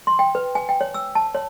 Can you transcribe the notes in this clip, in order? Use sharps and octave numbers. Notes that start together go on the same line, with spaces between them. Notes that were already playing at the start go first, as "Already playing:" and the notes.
C6
G5
B4
G#5
G5
C#5
E6
A5
C#5